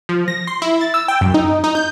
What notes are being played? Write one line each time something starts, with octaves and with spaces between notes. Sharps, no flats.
F3
A#6
C6
E4
A6
E6
G5
F#2
D#4
D#4
G6